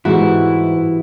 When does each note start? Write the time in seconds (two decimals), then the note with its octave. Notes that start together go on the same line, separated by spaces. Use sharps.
0.05 G#2 E3 G3 B3 E4 F#4